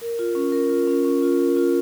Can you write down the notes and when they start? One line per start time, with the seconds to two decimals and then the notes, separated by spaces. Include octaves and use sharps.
0.01 A#4
0.19 F4
0.35 C#4
0.52 A#4
0.70 F4
0.87 C#4
1.05 C#4
1.22 F4
1.39 A#4
1.56 F4